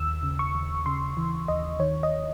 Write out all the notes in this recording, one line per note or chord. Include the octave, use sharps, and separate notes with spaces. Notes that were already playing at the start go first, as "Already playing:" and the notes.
Already playing: D#2 E6
C#3
C#6
D#2
C#3 C6
E3
D#2 D#5
D#3 C#5
D#5